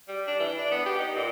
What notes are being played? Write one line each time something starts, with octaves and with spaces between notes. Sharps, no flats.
G3
D4
E3
D4
B3
G4
D#4
A#2